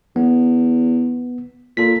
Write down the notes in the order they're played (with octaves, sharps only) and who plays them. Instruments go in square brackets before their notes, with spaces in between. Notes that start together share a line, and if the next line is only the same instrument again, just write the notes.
[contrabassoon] E2 [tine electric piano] B3
[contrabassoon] A#2 [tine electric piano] A4 B6